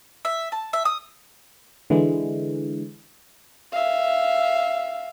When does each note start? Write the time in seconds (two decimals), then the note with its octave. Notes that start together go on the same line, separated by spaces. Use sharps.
0.25 E5
0.52 A5
0.73 E5
0.85 D#6
1.90 D3 E3 G#3
3.73 E5 F5